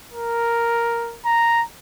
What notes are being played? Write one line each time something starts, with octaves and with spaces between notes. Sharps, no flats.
A#4
A#5